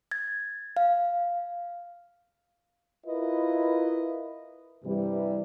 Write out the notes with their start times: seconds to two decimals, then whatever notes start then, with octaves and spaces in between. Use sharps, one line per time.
0.11 G#6 A6
0.77 F5
3.06 E4 F4 A#4 B4 D#5
4.85 G2 C3 E3 G3